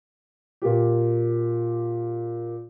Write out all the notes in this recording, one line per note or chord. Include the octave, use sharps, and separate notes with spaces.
A#2 G4